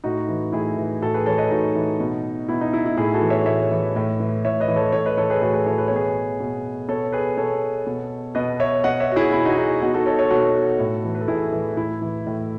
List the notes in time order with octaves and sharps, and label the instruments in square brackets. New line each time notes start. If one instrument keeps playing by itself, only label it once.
[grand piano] A2 D#4 F#4
E3
A2 E4 G#4
E3
A2 F#4 A4
G#4 B4
E3 A4 C#5
B4 D#5
A2 D#4 F#4
E3
B2
B2 E4
D#4
E4
E4
A2 E4 G#4
F#4 A4
E3
C#5 E5
A2 C#5 E5
E3
A2
E3
A2 C#5 E5
B4 D#5
E3
A4 C#5
A2 A4 C#5
B4 D#5
E3 A4 C#5
G#4 B4
A2 F#4 A4
G#4 B4
E3 A4 C#5
B4
B2 C#5
G#4 B4
B2
B2 A4 C#5
G#4 B4
B2 A4 C#5
B2
B2 B4 D#5
C#5 E5
B2 D#5 F#5
C#5 E5
F#4
E4 G#4
B2 E4
D#4 F#4
G#4
D#4 F#4
B2 D#4 F#4
F#4 A4
A4 C#5
A4 C#5
B2 F#4 A4
A2
E3
B4
A4
A2 E4 G#4
E3
A2 E4
E3
A2